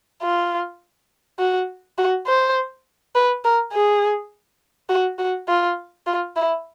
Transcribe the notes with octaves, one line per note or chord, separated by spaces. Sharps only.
F4
F#4
F#4
C5
B4
A#4
G#4
F#4
F#4
F4
F4
E4